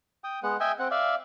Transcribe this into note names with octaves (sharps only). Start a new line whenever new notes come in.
G5 D#6
G#3 B3 F#5
D#5 E5 G5 G#5
C4 F#5
D5 E5 F5